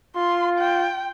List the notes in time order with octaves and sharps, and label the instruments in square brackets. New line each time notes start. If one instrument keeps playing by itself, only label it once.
[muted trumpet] F4 [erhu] C6
[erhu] G5